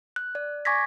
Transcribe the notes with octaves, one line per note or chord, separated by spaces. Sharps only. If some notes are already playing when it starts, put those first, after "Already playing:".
F#6
D5
G#5 C#6 D6 G#6 A#6 B6